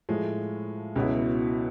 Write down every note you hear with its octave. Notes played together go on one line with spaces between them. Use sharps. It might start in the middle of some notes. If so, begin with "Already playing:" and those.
A2 F3 G#3
C#2 B2 F#3 B3 E4